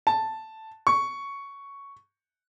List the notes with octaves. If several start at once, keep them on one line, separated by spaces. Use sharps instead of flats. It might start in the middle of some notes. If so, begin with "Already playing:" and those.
A5
C#6